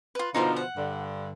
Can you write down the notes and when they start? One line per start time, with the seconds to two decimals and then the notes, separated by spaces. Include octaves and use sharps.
0.15 F4 B4
0.35 B2 D3 F3 D#4 F4 A#4
0.56 F#5
0.77 G2 D3